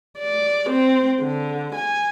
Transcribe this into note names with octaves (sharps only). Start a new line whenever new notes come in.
D5
C4
D3
G#5